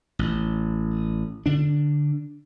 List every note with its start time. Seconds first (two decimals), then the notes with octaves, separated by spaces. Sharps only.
0.19 A1
1.46 D3 D4